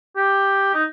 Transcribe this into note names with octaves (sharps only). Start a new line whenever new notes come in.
G4
D#4